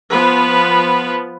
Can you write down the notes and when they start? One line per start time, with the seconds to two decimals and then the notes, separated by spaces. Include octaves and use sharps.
0.12 F3 B3 B4